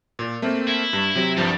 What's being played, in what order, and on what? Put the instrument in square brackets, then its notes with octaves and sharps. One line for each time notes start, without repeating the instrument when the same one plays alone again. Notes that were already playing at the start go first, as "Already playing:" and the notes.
[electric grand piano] A#2
A3 A#3 C4
[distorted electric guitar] E4
[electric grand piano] G2
C3 F#3
[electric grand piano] C2 G2 F3 [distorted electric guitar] G3